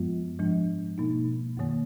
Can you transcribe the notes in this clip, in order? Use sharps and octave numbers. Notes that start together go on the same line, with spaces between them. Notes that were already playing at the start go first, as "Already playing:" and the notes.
Already playing: F#2 F3 G#3 B3 F4
G#2 F3 G#3 D4
B2 A#3 D#4
F#2 D#3 A#3